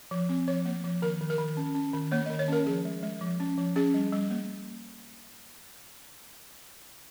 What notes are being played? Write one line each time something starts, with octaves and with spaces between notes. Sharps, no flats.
F3
C4
F3 C#5
A#3
F3
D#3 A#4
D#3
A#4
D#3
C#4
C#4
D#3
A#3 C#5
D#3 D#5
C#5
C#4 A#4
F3 G#4
G#3
G#3
F3
C#4
F3
C#4 G#4
G3
G3
A#3